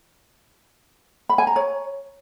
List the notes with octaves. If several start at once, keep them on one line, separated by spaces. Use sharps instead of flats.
B5
G#5
A#5
C#5